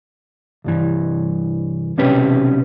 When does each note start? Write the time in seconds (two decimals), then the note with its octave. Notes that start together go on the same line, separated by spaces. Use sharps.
0.64 C2 G2 E3
1.98 B1 C3 C#4 G4 B4